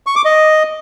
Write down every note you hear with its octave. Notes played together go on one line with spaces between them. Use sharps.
C#6
D6
D#5